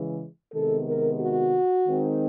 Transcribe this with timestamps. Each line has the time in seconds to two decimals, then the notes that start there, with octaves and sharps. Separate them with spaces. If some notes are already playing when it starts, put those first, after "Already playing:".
Already playing: C#3 E3 G#3
0.53 C3 D#3 G#3 B3 A4
0.87 A#4
1.20 F#4
1.86 D#3 G#3 C4 D#4